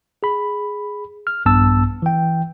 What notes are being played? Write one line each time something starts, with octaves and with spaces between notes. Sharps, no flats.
G#4 B5
F6
A#1 G2 B3 A5 E6
E3 G5